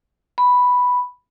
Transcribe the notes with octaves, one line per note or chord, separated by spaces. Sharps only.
B5